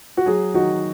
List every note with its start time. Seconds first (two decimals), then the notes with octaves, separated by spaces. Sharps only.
0.17 F#4
0.26 F#3 G#4
0.54 D#3 F#4